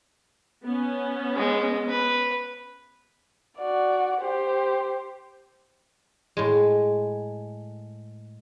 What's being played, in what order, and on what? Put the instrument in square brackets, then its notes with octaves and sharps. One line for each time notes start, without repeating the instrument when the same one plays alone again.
[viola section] B3 C#4
[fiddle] G#3
B4
[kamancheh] F#4 D5
G4 C5
[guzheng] A2 G#3